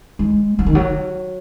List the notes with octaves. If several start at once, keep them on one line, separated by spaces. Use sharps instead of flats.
G#3
F#3
D#3
F#3